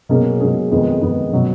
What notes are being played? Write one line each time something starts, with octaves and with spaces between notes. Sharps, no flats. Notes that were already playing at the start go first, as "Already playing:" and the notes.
B2 F#3 A#3 C#4 G#4
B2 F#3 A#3 C#4 G#4
F2 D#3 G#3 B3
F2 D#3 G#3 B3
B2 F#3 C#4